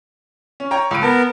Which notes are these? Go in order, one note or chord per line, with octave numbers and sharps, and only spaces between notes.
C#4
C#5 G5 A#5
C#2 B5 D7
B3 A#4 A5